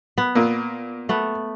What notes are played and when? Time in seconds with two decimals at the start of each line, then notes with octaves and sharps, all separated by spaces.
0.18 B3
0.35 A#2 A#3
1.09 A3 B3